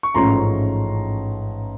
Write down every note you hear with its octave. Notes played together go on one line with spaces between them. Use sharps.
C#6
A1 G#2 F3 A3 C#4 A#5 C6